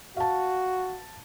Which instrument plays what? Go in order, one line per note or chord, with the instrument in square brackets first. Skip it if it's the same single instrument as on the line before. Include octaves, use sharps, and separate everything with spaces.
[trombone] F#4 [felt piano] F5 A5